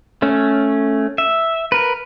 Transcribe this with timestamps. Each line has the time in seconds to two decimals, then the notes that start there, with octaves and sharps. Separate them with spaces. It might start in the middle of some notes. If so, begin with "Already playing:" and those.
0.22 A3 C#4
1.18 E5
1.72 A#4 B4